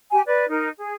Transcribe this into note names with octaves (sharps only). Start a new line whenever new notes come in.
G4 G#5
B4 D5
D#4 A#4
G#4